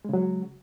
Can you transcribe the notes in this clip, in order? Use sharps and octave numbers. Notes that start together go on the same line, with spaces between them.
C#3 F#3 G#3